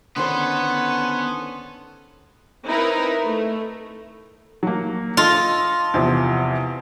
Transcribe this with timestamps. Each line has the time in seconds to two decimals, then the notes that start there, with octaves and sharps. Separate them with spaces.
0.16 D3 D#3 B3 C#4 A4 C5 C6
2.66 C4 D#4 E4 A#4 B4
3.25 A3
4.63 F#3 A#3
5.17 F4 A4 D#5 A5
5.94 E2 C3 F3